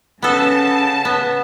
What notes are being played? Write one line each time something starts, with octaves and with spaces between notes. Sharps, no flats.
C#3 B3 A4 A5
B3